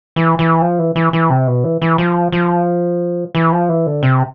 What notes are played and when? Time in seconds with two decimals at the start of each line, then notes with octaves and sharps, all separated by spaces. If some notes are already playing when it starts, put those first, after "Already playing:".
0.16 E3
0.39 E3
0.62 F3
0.79 E3
0.96 E3
1.13 E3
1.30 C3
1.47 B2
1.64 E3
1.82 E3
1.98 F3
2.32 F3
3.35 E3
3.52 F3
3.69 E3
3.86 D3
4.03 C3